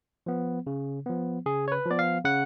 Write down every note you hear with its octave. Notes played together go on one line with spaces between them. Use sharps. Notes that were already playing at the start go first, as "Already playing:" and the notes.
F3 B3
C#3
F3 B3
C#3 G#4
C#5
B4
F3 B3 D5
F5
C#3 F#5